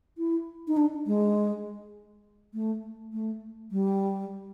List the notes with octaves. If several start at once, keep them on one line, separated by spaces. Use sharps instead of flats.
E4
D#4
D4
G#3
A3
A3
G3